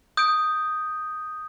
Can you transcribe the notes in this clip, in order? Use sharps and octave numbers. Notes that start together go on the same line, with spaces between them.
D#6 G6 D7